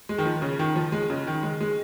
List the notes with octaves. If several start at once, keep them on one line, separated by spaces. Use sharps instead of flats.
G#3
D#3
F3
C#3
D#3
F3
G#3
C#3
D#3
G#3
G#3